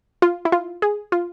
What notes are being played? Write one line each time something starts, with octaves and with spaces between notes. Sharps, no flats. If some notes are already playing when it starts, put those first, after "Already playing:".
F4
E4
F4
G#4
F4